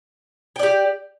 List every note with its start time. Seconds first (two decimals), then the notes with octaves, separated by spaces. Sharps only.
0.56 G5
0.59 D5
0.63 G4